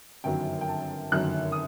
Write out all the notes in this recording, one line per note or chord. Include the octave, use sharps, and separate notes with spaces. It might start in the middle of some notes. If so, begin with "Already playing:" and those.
G1 F#2 D#3 F#3 G5
G5
A5
G1 F#2 D#3 F#3 F#6
D#6